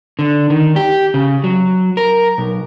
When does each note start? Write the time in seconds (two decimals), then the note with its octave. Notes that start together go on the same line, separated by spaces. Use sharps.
0.19 D3
0.50 D#3
0.76 G4
1.14 C#3
1.44 F#3
1.97 A#4
2.38 B1